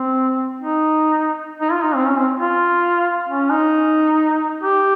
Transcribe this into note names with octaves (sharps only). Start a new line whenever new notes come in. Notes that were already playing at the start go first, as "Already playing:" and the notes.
Already playing: C4
D#4
D#4
F4
D#4
C4
C#4
C4
F4
C#4
D#4
G4